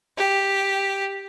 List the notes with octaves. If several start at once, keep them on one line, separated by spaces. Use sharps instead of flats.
G4